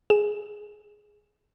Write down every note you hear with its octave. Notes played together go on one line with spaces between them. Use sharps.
G#4 E7